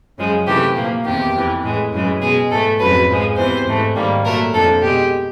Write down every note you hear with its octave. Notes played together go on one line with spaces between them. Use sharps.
F#2 C#3 F3 G#3
C3 E3 A3 G4
A#2 F3 A#3
E2 C3 D#3 G4
F2 C3 E3
A2 E3 G#3
F#2 C#3 E3 G#3
B2 G#3 G#4
G#2 E3 A3 A4
F2 C#3 F#3 B4
G#2 F3 G#3
E2 C3 E3 C5
G#2 E3 A3
G#2 D#3 G3 A#3
A#2 F#3 A3 A#4
F2 D3 F3 A4
B2 G#3 G4